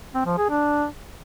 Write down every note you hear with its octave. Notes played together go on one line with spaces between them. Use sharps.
C4
F3
G#4
D4